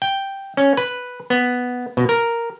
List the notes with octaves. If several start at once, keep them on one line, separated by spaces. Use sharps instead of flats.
G5
C#4
B4
B3
B2
A#4